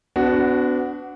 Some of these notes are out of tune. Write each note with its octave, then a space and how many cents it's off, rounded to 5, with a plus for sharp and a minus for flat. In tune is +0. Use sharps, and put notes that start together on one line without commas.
B3 +30 D4 -20 F#4 +0